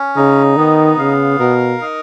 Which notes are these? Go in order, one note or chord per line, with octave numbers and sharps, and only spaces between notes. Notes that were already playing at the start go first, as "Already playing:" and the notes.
Already playing: C#4
C#3 D#4
D#3 B3
C#3 F5
B2 A#4
D#4